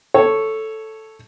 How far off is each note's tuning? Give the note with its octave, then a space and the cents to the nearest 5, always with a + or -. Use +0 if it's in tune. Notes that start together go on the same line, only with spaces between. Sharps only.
A4 +0 C#5 +0